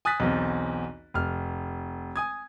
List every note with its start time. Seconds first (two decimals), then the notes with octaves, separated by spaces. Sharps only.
0.05 G#5 D#6 F#6 A6 B6
0.20 B1 E2 C4
1.14 F1 F6
2.16 G#5 D#6 G#6